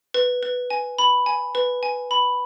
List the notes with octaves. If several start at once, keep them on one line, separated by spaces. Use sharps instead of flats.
B4
B4
G#5
B5
G#5
B4
G#5
B5